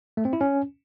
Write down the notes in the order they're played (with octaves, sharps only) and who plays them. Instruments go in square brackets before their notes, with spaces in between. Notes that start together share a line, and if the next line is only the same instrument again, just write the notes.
[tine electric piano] A3
C4
E4
C#4